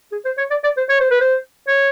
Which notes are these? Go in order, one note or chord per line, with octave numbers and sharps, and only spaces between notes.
G#4
C5
C#5
D5
D5
C5
C#5
C5
B4
C5
C#5